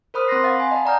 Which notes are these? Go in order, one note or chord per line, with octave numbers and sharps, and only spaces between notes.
A#4 C5 B5 D#6 F6 F#6
C4 C6 F#6 A#6 C7
F5 F#5 B5 A6
G#5
D#5 A5
D5 F#5 A#5 D#6 F6 G6